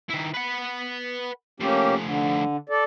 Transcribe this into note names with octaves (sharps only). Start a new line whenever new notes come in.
D#3 E4
B4 F#5
F3 A3 A#3 C#4 G4
D3
A4 D5